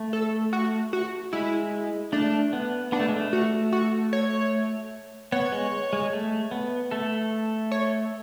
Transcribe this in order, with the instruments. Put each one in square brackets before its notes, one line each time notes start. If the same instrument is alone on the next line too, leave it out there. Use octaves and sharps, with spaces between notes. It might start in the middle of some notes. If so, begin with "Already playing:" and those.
Already playing: [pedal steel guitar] A3
[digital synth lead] A4
F#4
F#4
[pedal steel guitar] G#3 [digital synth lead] E4
[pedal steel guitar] A3 [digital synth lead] D4
[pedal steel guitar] B3
[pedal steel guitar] B3 [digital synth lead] D4
[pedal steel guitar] A3
G#3
A3
[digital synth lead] F#4
F#4
C#5
[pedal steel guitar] B3 [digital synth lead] C#5
[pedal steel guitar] G#3
G#3
A3
B3
A3 A4
[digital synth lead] C#5